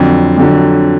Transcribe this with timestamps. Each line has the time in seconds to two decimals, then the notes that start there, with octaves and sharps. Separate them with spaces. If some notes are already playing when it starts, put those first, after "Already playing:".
Already playing: F2 D3 F#3
0.38 F2 D3 F#3